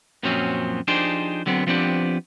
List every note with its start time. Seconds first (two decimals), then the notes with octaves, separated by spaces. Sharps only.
0.23 F#2 A#2 F3 F#3 C4 C#4
0.88 F3 D4 D#4 G4 G#4 C5
1.46 D3 F#3 B3 C4
1.67 F3 B3 C4 D4 G4